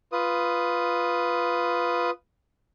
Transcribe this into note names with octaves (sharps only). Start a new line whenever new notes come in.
F4 B4 D#6